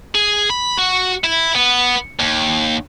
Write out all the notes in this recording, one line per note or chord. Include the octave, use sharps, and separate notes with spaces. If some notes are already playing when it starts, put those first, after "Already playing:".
G#4
B5
F#4
E4
B3
D#2